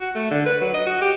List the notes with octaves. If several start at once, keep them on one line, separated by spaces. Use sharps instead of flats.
F#4
A3
D3
B4
F#3
D#5
F#4
G4